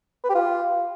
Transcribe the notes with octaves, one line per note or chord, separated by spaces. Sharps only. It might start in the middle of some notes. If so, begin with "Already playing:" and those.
B4
G4
F4